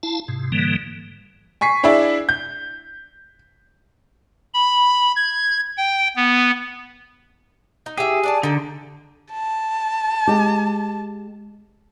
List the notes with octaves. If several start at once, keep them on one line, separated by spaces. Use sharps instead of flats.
E4 F5 A5
G#2 C3
G#2 D3 E3 G3 A#3
G#5 C#6 B6 C7
D4 E4 G#4 D5 E5
G6
B5
G#6
G5
B3
D#4
E4 G4 G#4
D4 D5 A5
D3 D#4 A4
A5
G#3 G4